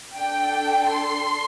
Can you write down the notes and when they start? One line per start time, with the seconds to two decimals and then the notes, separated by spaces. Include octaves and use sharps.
0.15 D4 A4 G5
0.90 C6